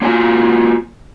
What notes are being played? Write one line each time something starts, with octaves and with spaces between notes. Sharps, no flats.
A#3 D4 F4 F#4 G#5